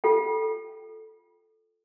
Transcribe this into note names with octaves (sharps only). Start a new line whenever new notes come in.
F4 A4 G5